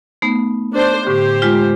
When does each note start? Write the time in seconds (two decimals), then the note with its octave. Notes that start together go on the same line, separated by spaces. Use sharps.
0.22 A3 B3 D#4
0.73 D4 C5
1.07 A2 D3 G4 C5
1.42 G#3 F4